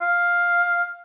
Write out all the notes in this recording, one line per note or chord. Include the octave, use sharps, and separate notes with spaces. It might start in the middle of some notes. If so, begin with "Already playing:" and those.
F5